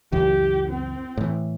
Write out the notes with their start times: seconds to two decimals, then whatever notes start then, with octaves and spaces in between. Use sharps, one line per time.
0.12 C#2 F#2 E3 G4
0.69 C4
1.17 A2 E3